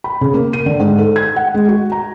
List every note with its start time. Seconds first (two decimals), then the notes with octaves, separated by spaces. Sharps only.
0.04 B5
0.21 C#3
0.34 A#3
0.53 D#7
0.66 D3
0.79 G#2
0.99 A4
1.16 G#6
1.36 F#5
1.54 G#3
1.69 F#4
1.92 A#5